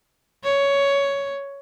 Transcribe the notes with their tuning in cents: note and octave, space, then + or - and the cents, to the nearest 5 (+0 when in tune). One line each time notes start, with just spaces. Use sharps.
C#5 +10